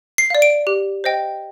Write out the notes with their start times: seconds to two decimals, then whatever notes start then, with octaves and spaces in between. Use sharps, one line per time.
0.18 C7
0.30 D5 F5
0.42 D7
0.67 G4
1.04 C5 D#5 G5